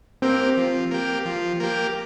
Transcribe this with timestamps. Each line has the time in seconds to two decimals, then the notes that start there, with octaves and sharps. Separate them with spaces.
0.22 A#3 C4 G4
0.57 F3
0.91 A#3 G4
1.25 F3
1.60 A#3 G4